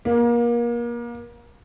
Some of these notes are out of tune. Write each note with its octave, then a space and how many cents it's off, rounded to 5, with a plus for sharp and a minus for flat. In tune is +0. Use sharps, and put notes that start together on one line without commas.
A#3 +30